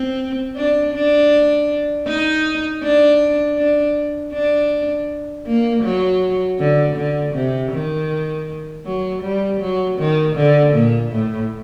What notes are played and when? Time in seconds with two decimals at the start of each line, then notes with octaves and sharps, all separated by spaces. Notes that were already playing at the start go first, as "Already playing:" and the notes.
Already playing: C4
0.56 D4
0.94 D4
2.07 D#4
2.82 D4
3.57 D4
4.33 D4
5.46 A#3
5.83 F#3
6.59 D3
6.97 D3
7.34 C3
7.72 D#3
8.86 F#3
9.23 G3
9.61 F#3
9.98 D#3
10.36 D3
10.73 A#2
11.11 A2